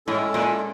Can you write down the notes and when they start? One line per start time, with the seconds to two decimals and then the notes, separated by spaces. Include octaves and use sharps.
0.07 A2 G#3 C#4 E4 A4
0.34 A#2